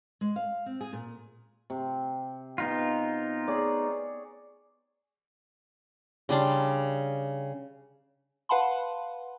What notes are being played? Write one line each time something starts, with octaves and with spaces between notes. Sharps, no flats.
G#3
F5
C4
G#4
A#2
C3
B3 D#4 F4
G#4 C#5 D5
C#3 G3 D4 C6
B4 F5 F#5 A5 B5 C6